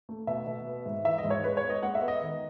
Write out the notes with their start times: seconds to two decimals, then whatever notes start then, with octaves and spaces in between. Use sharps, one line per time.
0.09 A3
0.27 B2 E5
0.47 B2
0.66 B3
0.86 G#2
1.04 E3 E5
1.18 D#5
1.24 G#2
1.30 C#5
1.43 G#3 B4
1.57 C#5
1.62 B3
1.70 D#5
1.83 G#3 F#5
1.95 E5
2.02 B3
2.08 D#5
2.21 D#3